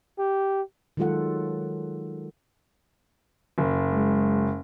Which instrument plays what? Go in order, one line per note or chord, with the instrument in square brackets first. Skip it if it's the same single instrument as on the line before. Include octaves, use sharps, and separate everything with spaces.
[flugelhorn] G4
[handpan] D#3 F#3 G#3 F4 A4 F#5
[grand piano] F#1
[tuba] G#3